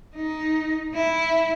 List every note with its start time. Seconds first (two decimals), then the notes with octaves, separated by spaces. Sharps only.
0.16 D#4
0.95 E4